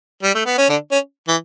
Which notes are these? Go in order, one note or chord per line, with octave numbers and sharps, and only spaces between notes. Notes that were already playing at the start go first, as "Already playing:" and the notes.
G3
A3
B3
C#4
D3 D4
C#4
E3